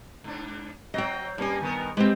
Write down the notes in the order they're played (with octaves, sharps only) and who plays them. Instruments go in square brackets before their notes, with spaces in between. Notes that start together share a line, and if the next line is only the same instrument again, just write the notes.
[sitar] G#2 D4
[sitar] F#3 C4 [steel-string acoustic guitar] D#5 G5
[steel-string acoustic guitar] G2 G#5 [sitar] G3 A#3 C#4
[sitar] D#3 B3 A#4
[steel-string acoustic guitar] G#3 C4 [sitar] G4 B4 C5